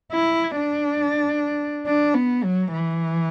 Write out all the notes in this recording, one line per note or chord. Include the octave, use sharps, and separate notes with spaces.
E4
D4
D4
B3
F#3
E3